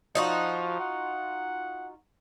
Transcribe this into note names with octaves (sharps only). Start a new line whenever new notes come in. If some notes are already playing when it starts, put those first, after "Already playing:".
F3 D#4 F4 F#4
F#5